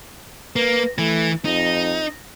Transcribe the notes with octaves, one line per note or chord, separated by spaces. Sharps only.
A#3 B4
E3 A3
F2 D#4